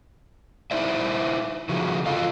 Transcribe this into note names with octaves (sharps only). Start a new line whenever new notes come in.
D#4 E4 C5 D5 E5
C#3 F3 F#4 G#4
F4 A4 D#5 F5